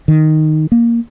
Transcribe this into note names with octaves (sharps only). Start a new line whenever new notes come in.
D#3
A#3